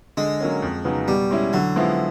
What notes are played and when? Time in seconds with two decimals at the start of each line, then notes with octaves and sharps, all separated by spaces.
0.17 D3 G#3
0.40 F#3 A#3 C#4
0.62 F2
0.85 C#3 F#3 B3 D#4
1.08 B2 G3
1.31 G#3 C#4 E4
1.53 D3 F#3
1.76 F3 G#3 B3 E4